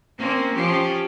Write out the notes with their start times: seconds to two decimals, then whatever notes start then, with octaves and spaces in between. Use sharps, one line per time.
0.19 A#3 C4 C#4
0.55 F3 C#4 G4